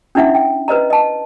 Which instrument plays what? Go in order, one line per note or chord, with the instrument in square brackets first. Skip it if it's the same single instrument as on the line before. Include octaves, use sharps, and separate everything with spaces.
[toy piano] C#4 D4 E4 E5 F#5
G5
B4 C5 D#5 A#5
D#5 A5